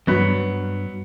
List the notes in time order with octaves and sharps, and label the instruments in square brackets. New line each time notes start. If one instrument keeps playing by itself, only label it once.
[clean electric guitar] E2 G2 [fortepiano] F#3 B3